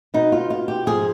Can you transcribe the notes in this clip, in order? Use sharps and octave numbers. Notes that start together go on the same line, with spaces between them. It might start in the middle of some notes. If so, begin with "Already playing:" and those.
B2 D#4
F4
F4
G4
G#2 F3 G#4